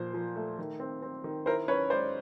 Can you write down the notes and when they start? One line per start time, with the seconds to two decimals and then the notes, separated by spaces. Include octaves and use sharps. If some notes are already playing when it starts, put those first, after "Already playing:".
Already playing: A#2 F3 C5
0.13 F3
0.36 A3
0.59 D#3
0.80 C4
1.02 C4
1.24 D#3
1.46 E4 A#4 C5
1.68 C#4 B4 C#5
1.90 G#3 C5 D5